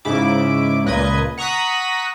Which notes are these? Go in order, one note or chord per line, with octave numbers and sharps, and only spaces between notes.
G#2 C#3 E4 D6
C#2 A#2 B4 D#5 G#6
F#5 A#5 C#6 D#6 F#6 B6